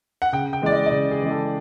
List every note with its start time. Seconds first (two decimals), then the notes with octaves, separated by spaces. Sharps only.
0.22 F#5
0.32 C#3 G5
0.53 G5
0.62 E3 G#3 D5
0.72 D#5
0.86 D#5
0.91 C#3 D5
1.11 G#4
1.22 E3 G#3
1.31 A4